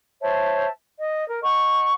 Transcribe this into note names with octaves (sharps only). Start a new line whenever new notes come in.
C5 C#5 E5 A5
D#5
A#4
D#5 F#5 C#6